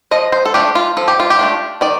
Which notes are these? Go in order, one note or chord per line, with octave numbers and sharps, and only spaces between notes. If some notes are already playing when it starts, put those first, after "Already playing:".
F3 D#5
C5
A4
A3 D4 F4 G4
F4
F3 A4
G4
F4
G4
A3 D4 F4
D#3 D5